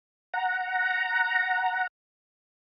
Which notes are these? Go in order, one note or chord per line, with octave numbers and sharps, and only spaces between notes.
F#5 A#5